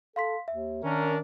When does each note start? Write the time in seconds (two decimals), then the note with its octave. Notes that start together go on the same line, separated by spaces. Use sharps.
0.16 A4 F5 C6 B6
0.48 D#2 E5
0.83 D#3 C#4 D4 A#4